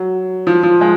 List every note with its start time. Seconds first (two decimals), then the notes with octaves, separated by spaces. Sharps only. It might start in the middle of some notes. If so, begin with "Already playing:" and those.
Already playing: F#3
0.47 F3
0.63 F3
0.81 G#3